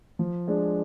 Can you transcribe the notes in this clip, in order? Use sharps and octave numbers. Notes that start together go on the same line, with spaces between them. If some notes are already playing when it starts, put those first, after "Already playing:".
F3
G#3 D4 G#4 D5